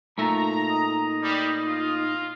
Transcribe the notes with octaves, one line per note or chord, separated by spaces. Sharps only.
A#2 A3 D#4 E5 A#5
D#5
G3
F4